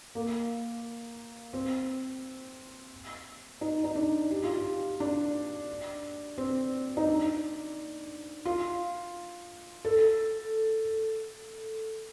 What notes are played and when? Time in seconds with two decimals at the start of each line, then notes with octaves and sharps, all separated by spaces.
0.15 A#3
1.53 C4
3.61 D#4
3.84 D#4
3.95 D4
4.31 G4
4.44 F4
4.57 G4
5.00 D4
6.38 C4
6.97 D#4
7.07 D4
8.45 F4
9.85 A4